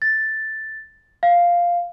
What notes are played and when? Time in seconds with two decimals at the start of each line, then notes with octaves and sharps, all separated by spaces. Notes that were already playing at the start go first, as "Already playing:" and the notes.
0.02 A6
1.23 F5